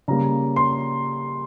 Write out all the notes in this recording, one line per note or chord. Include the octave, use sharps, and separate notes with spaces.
C#3 G3 A#3 A#5
C6